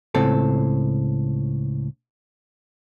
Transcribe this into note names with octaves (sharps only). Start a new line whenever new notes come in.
C#2 A2 C4 A4